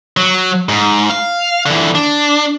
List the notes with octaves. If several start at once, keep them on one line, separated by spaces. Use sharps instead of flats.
F#3
G#2
F5
D3 E3
D4